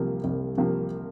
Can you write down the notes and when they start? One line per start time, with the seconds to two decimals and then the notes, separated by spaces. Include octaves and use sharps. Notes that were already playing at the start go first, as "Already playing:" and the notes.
Already playing: C2 C3 F3 A#3
0.24 C2
0.58 C3 F3 A#3